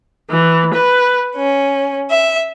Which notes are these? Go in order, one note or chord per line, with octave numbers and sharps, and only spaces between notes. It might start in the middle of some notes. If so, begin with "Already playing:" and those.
E3
B4
C#4
E5